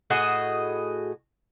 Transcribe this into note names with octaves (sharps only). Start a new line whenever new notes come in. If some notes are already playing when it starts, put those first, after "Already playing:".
A2 F#4 G#4 D#5